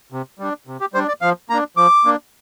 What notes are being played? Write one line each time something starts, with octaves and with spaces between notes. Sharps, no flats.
C3
G3 D4
C3
G4
G3 D4 C5
D5
F3 F5
A#3 D4 A#5
F3 D6
A#3 D4